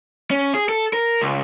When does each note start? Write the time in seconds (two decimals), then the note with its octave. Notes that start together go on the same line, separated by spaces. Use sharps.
0.31 C#4
0.54 G#4
0.69 A4
0.93 A#4
1.21 C#2